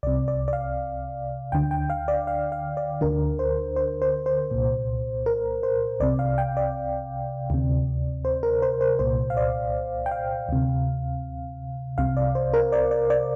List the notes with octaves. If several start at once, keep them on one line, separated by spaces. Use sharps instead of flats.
C2 C3 D5
D5
D5
F5
D2 D3 G5
G5
F5
D5
F5
F5
D5
D2 D3 A#4
C5
C5
C5
C5
C2 A#2
A#4
C5
C2 C3 D5
F5
G5
D5
D2 C3
C5
A#4
C5
C5
C2 A#2 C5
F5
D5
G5
F5
D2 C3
C2 C3 F5
D5
C5
A#4
D5
D5
D5